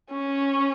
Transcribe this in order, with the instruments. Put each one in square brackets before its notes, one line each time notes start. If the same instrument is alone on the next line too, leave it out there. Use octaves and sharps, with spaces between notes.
[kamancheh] C#4